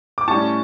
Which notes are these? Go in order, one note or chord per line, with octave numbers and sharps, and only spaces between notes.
D6
A2 G3 C#4 A5 C#6